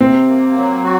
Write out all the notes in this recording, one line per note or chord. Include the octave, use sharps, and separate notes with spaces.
C3 C4
A#3
F#3
F#4